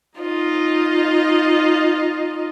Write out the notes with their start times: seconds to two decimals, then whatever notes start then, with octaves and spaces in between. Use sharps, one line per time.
0.18 D#4 F4 D#5